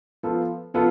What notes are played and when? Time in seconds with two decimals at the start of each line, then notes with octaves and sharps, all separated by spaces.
0.23 F3 B3 F4 A4
0.74 F3 B3 F4 A4